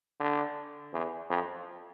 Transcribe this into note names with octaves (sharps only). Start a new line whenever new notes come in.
D3
E2
F2